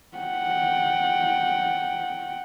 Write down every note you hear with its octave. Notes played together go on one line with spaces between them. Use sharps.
F#5 G5